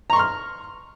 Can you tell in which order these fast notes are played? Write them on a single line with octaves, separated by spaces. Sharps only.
A#5 C#6 C6 F6